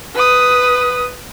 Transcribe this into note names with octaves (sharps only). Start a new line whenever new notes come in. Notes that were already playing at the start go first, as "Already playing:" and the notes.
B4 D#6